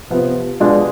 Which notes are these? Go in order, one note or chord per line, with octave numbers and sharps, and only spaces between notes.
C3 F3 B3
B2 G#3 D4 F4 G#4